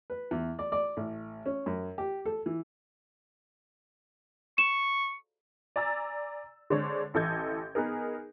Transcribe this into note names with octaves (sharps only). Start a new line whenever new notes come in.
B4
E2
D5
D5
A1
C#4
F#2
G4
A4
E3
C#6 E7
D5 G#5 A#5 E6 A6
D3 G#3 D4 C5 C#5
A1 E3 A4 D#5 G6 G#6
B3 D#4 G#4 A#4